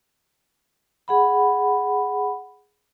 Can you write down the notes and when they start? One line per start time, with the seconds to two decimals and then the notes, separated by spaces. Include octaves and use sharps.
1.08 G#4 F#5 B5